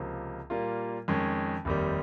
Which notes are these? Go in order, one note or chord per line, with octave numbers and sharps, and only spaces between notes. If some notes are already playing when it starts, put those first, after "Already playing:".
Already playing: C#2 C3 F3 A#3
A#2 G3 A#3 F4
F2 D#3 G#3 C#4
F1 D#2 D#3 G3